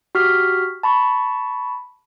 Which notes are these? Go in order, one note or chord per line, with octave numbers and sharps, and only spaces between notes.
F#4 G4 F6 B6
A5 B5 C#6